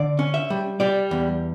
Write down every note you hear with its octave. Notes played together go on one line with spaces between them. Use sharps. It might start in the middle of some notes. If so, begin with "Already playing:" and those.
Already playing: D3 D5
C#4
E5
G3
G3 D5
E2